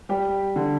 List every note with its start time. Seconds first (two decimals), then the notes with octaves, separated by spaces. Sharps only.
0.09 G3 G4
0.56 D3